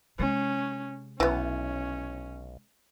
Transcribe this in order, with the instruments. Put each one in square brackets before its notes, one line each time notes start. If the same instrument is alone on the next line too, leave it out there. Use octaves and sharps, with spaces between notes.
[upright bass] C3 G#3 [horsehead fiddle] C#4
[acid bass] B1 [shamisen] E3 B3 [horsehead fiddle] C#4